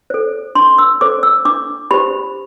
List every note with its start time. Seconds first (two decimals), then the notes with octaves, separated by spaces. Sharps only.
0.10 A4 C5
0.55 D4 C6
0.78 E6
1.01 A4 C5 D6
1.23 E6
1.45 D4 D6
1.91 G4 C5 B5